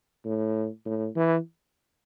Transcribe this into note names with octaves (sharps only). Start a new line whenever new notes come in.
A2
A2
E3